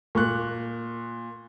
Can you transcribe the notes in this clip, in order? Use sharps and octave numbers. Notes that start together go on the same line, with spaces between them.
A#2 C#6 F#6